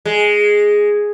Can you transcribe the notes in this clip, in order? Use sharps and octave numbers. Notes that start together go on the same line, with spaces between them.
G#3